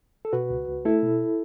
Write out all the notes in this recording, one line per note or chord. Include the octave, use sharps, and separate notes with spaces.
A4
B2 F#4 B4
C#2
C#2
A3 E4 A4
B2